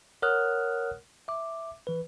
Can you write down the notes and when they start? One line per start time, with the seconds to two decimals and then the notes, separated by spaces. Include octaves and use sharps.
0.22 A#4 C#5 F#5 D#6 F6 F#6
1.28 E5 D6
1.87 E3 B4